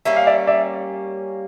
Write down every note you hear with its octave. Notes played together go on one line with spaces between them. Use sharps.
G3 A#3 C#4 E5
F5
D5 E5
D5 E5